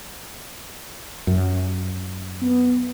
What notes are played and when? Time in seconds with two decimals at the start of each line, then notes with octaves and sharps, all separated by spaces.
1.27 F#2
2.41 B3